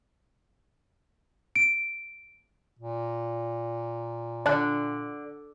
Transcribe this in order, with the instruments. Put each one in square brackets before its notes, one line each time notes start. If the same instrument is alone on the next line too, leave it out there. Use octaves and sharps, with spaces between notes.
[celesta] D7
[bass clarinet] A#2
[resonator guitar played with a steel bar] D3 [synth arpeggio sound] D5 A5 F#6